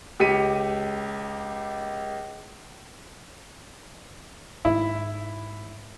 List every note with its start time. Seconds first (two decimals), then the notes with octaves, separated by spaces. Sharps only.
0.20 C#2 G4 B6 C#7 D#7
4.65 G#2 D#3 E4